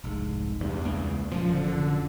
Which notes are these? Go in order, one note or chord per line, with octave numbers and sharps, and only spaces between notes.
F1 C2 G#2
E2 G2
C#2 A#3
F1 F#2 A#2 F3
D3